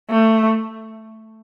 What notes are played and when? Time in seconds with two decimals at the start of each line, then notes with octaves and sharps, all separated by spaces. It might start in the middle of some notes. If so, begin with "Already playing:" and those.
0.11 A3